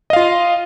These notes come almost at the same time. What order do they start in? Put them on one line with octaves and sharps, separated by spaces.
D#5 F5 F4